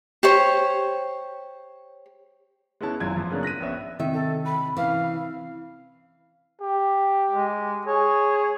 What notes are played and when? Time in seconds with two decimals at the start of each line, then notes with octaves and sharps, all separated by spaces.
0.23 G4 C5 C#5
2.81 G#3 B3 C#4 E4 A5
3.00 G#1 F#2 E4 F4 G#6
3.15 E3 F3 E4
3.30 F#2 C#3 A#3 B3 C#4 D4
3.43 F#6 A#6 B6 D#7
3.60 A#1 B3 C#4 E5
3.99 C3 D#3 E5
4.13 A4
4.45 B5
4.77 E3 C#4 F5
6.62 G4
7.30 G#3
7.87 G#4 C#5